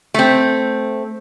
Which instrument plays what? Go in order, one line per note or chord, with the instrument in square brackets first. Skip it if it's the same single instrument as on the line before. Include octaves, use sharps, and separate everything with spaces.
[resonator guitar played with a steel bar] A3 C4